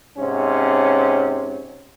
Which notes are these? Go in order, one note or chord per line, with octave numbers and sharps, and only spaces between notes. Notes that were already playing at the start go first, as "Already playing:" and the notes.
G#2 C3 C#4